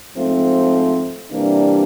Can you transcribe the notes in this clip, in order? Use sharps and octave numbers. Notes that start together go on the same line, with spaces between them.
G#2 F3 A3 C4
C3 E3 G3 A#3 D4